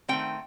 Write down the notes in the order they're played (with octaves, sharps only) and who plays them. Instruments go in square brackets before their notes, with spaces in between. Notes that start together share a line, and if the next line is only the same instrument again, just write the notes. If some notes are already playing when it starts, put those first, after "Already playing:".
[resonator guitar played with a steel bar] D#3 A3 C4 G5